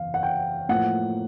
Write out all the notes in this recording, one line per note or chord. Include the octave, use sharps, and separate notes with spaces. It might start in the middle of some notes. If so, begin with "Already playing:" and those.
Already playing: F#1 E2 C3 F5
F#5
G5
A2 F3 A#3 F#5